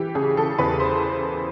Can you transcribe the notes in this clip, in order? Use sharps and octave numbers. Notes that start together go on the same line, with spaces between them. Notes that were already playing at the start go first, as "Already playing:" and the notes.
Already playing: E3 G4
C#3 G#4
E3 A4
E2 B4
C5